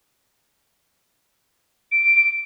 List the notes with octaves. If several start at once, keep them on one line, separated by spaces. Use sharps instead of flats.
D7